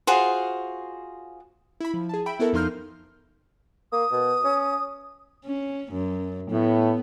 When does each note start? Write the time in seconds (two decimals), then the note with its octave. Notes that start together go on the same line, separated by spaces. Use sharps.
0.07 F4 F#4 G#4 C5
1.81 E4 B5
1.94 F3
2.09 G#4 A5
2.26 E5 G5 B5 D7
2.40 B3 E4 F#4 A4 A#4
2.53 F2 F3 D#4 C6 F6 G6
3.92 A#3 D#6
4.11 B2
4.44 C#4
5.45 C#4
5.93 F#2
6.51 A2 B3